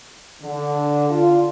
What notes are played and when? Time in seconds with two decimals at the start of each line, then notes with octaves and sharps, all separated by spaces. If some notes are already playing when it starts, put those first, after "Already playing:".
0.43 D3
1.10 F4